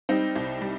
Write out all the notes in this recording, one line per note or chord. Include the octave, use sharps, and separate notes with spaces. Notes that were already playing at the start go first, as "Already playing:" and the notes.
G3 C4 D#4
C2
G3